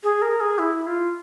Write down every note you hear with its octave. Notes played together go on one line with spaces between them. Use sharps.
G#4
A#4
G#4
E4
F4